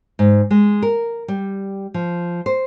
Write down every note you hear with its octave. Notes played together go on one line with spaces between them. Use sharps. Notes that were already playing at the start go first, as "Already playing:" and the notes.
G#2
G#3
A#4
G3
F3
C5